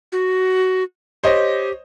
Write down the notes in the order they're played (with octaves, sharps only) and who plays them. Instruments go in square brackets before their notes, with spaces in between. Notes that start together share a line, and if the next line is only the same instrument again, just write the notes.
[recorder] F#4
[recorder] G4 [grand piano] C5 C#5 D#5